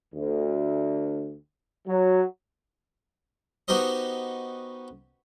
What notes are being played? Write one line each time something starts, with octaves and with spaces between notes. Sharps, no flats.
D2
F#3
B3 D#4 F#4 G4 C5 D#5